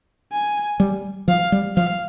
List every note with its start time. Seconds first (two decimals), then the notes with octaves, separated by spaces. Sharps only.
0.33 G#5
0.80 G3
1.28 F3 F5
1.52 G3
1.76 F3 F5